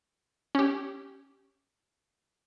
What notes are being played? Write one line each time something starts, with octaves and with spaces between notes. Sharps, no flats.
C#4 G4